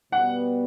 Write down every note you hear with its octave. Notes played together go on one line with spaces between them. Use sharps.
B2 G3 B3 F#5